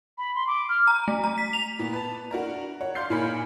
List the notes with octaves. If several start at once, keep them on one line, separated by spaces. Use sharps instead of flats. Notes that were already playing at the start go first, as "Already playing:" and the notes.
B5
C6
D6
F6
A#5
A3
A#5
B6
F7
A#2 B3
B4 A5
D4 F#4 A#4 A#5
C#5 F#5
D5 F5 C6 F6 G6 C7
A#2 D#4 A#4 G#5 B5 C#7